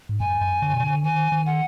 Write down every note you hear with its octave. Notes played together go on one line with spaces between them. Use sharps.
G#2
F#2 G#5
F#2
D3
B2
D3
D#3 G#5
D#3
F#5